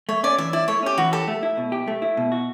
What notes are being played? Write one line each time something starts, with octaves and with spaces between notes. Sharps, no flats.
A3 C#5
C#4 D5
E3 E5
E4 D5
A3 C#5
C#4 G4
E3 F#4
G4 A4
A3
E4
B2
G4
A3
E4
B2
F#4